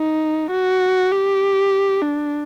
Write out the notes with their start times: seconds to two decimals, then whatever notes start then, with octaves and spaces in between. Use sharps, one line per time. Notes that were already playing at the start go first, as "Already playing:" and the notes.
Already playing: D#4
0.52 F#4
1.12 G4
2.02 D4